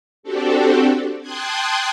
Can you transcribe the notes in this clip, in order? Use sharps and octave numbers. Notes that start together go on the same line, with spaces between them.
C4 D4 F#4 G4 A4
G5 A5 C6 D#6 F#6 G#6